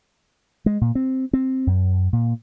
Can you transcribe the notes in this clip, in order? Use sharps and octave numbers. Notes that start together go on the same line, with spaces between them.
G#3
A#2
C4
C4
F#2
A#2